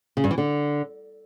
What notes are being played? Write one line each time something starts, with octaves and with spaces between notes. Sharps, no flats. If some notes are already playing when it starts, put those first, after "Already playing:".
C#3
G2
E3
D3